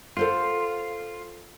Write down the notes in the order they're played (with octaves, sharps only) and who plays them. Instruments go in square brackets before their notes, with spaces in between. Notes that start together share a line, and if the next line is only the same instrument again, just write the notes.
[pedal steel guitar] F4 [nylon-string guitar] A4 C5 F#5